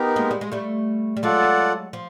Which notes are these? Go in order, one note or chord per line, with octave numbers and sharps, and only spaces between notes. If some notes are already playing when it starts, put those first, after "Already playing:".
Already playing: B3 D#4 G4 A#4
G#3 A#3
G3
G#3
G3 A3
G3
F#3 G#3 F4 A4 D5 F#5
F3